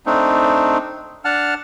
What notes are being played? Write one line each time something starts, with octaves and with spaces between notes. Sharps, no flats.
A3 C4 D4 D#4
D4 F#5 A5 F6